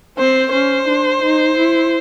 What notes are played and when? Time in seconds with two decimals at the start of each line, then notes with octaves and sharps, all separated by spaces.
0.18 C4 C5
0.52 C#4 C5
0.87 D4
1.22 D#4
1.57 E4